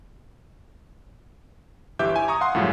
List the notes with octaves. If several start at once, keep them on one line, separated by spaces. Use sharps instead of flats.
G1 E3 G4 E5 D6 G6
G#5
A#5 C#6 D#6
F5 F#5 C6
F#2 A2 C#3 F3 G3